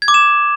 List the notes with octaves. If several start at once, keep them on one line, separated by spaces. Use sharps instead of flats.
G#6
D6
E7